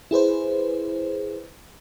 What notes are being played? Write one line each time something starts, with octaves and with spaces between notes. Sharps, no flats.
E4 G#4 B4 C5